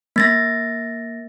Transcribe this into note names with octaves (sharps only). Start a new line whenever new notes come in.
A#3 A6 A#6